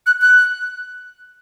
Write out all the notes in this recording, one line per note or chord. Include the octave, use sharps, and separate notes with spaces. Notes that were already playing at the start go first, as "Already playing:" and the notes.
F#6
F#6